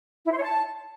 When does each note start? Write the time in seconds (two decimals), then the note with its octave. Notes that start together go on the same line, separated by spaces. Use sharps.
0.25 E4
0.31 C5
0.37 C#5
0.42 A5